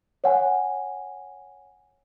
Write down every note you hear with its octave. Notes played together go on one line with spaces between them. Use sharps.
C#5 F#5 G#5